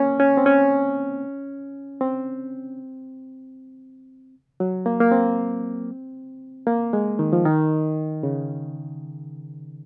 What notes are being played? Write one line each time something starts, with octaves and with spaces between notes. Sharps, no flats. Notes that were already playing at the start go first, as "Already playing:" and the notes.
Already playing: A#3 C#4
C#4
C4
C#4
C4
F#3
A#3
A#3
C4
A#3
G#3
D#3
F3
D#3
C#3